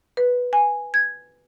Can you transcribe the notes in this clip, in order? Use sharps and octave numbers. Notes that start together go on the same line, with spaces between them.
B4
G#5
G#6